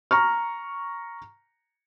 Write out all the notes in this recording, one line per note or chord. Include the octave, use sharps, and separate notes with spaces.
A#5 C#6 F6